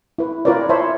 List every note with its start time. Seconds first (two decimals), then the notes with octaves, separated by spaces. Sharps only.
0.18 E4 B4
0.45 E4 F4 A#4 B4 C#5 D5
0.69 C5 C#5 E5 A5 B5 C6